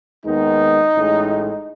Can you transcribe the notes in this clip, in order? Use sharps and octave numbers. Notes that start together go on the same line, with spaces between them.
D#2 D#3 G#3 B3 D#4
A1 A2 G#3